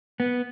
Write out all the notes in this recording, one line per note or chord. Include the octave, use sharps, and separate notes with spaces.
B3